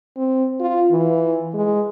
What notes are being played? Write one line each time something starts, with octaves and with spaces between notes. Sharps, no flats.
C4
F4
E3
G#3